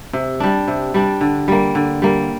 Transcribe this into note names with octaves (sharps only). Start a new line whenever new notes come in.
C3
G3 D4
C3
G3 D4
D3
G3 A#3
D3
G3 A#3